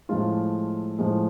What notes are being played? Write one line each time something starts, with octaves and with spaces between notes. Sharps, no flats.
A2 F3 G#3 F4
A2 F3 G#3